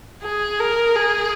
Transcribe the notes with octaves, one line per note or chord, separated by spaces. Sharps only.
G#4
A#4
G#4